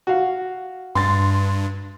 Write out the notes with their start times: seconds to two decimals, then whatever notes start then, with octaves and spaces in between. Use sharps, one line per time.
0.07 F#4 F5
0.95 G2 C6 A6